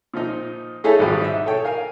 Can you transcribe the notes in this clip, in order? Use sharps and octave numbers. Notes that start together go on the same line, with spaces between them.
A#2 F3 D#4
A3 D#4 E4 G#4 A4 C#5
G#1 G#2 D#3 F3 G3 F#4
D#4 E5
A4 C#5 G5
A#4 F5 G#5